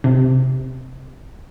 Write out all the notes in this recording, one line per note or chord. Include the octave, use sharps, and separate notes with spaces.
C3